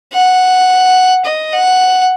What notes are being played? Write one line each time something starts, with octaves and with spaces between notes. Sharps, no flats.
F#5
D#5
F#5